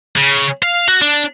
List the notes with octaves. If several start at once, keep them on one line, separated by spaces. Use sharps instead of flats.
C#3
F5
F#4
D4